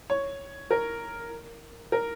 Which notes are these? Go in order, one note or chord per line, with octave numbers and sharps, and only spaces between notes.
C#5
A#4
A#4